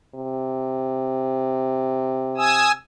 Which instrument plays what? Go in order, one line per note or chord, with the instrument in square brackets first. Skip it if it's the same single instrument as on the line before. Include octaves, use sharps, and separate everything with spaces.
[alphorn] C3
[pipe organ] G#5 D#6 E6